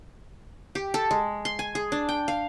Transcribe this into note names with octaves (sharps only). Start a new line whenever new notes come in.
G4
A4
G#3
C6
G#5
G#4
D4
G5
F5